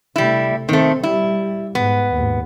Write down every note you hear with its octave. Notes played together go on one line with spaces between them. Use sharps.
C3 G3 A3 E4
D#3 A3 C4
G3 E4
G#2 B3
D#2 G#2